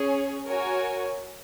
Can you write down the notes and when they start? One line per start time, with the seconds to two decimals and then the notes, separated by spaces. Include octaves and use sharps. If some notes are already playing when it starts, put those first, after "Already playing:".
Already playing: C#4 G#4 C#5
0.47 F#4 A#4 C#5 G#5